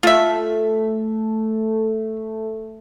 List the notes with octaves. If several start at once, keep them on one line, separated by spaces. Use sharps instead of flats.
A3 F4 E5